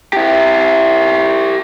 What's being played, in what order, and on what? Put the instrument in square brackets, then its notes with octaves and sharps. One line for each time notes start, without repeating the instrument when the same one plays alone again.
[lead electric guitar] E4 G4